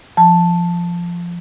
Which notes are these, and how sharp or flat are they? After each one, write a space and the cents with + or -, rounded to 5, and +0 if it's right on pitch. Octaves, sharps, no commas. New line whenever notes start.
F3 -10 A5 +0